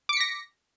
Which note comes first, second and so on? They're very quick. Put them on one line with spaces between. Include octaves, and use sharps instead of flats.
D6 C#7 B6 A#6